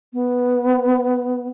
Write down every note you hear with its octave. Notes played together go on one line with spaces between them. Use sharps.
B3